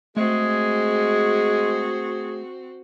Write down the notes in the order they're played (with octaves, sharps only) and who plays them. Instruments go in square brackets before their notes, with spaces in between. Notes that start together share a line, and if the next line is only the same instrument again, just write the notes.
[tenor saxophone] G#3 [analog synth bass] A3 [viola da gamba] C4 F#4 [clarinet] G#4